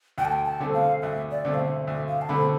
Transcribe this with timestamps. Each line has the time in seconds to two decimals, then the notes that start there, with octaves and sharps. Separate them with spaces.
0.18 D2 G5
0.25 A5
0.32 G5
0.45 A5
0.60 D3 A3 C4
0.74 F5
1.02 D2 E5
1.31 D5
1.45 D3 A3 C4
1.54 F5
1.59 E5
1.87 D2 E5
2.08 F5
2.22 A5
2.29 D3 A3 C4 B5